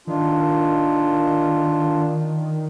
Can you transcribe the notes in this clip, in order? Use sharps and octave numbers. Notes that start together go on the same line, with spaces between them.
D#3 D4 F4